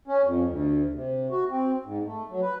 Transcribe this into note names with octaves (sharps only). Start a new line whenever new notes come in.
C#4
F2
D2
C3
F#4
C4
G#2
A3
F#3
B4